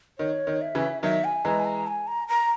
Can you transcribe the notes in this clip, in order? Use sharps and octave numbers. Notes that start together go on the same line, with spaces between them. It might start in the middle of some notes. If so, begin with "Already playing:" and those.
D#3 C#5
D#3
E5
C#3 E3
D#3 F#3 E5
G#5
E3 G#3 A#5
G#5
A#5
G#5
A#5
A#5